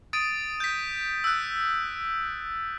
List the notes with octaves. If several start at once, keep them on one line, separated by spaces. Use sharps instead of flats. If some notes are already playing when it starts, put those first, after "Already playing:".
D#6 A6 D7 D#7
G6 B6
E6 F#6